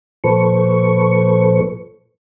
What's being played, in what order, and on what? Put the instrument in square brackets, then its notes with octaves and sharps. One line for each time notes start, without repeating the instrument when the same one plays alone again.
[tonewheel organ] A#2 F3 A4 B4 C5 C#6